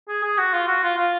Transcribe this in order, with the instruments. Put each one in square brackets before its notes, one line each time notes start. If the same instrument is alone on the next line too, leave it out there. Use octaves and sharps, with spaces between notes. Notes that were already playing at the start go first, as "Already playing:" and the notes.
[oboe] G#4
G#4
F#4
F4
F#4
F4
F4